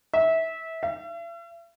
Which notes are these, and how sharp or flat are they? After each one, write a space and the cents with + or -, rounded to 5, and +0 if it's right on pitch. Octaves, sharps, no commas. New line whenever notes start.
E5 -20
E5 +45